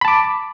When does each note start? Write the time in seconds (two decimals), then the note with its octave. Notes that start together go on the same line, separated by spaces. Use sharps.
0.01 B5
0.05 A5
0.08 D6